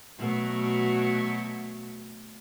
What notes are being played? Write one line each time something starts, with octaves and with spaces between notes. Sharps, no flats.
B2 F#3 A3